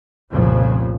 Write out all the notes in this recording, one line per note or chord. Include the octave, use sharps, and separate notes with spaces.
F1 C2 F2 A#2 C#3 F3